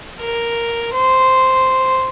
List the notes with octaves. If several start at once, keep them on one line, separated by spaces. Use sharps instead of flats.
A#4
C5